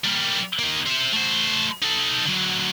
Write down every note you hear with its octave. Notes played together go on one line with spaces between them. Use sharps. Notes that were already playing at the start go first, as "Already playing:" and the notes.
G3 A#3
A#3 D#4
C5 E5
A3 C5
D#4 A4
D3 F#3